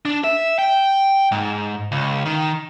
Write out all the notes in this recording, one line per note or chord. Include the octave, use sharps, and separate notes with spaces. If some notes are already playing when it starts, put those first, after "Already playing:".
D4
E5
G5
G#2
C#2
D#3